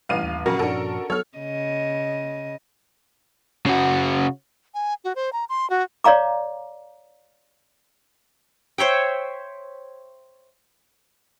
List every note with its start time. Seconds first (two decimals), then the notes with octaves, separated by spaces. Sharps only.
0.09 A1 G2 F5 D#7
0.24 D#2
0.46 F2 A#2 C#3 F#3 F#4 A#4
0.59 G2 A#2 F3 C#4 D4 A4 A#4
1.10 F#3 B3 A4 C#5 F6
1.38 C#3 D#5
3.66 C#3 F#4
4.74 G#5
5.04 F#4
5.15 C5
5.33 A#5
5.49 C6
5.70 F#4
6.04 C#5 D5 F5 A#5 D6
8.78 C5 C#5 E5 G5